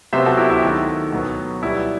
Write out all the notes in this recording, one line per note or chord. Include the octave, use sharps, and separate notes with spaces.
C3 F#3 B3 C5 E5
F#4 A4
E4 G4
E4
D#3 A3 F#4
B2 F#3 B3
B2 G3 B3 E4